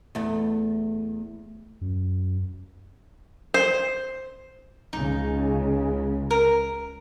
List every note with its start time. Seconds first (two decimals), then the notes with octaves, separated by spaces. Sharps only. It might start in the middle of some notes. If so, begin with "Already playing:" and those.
0.15 E2 A3
1.81 F#2
3.54 C5
4.93 C#2 C#3 G#3 D#4
6.31 A#4